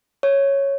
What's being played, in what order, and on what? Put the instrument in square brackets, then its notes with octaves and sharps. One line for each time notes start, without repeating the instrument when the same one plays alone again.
[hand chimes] C#5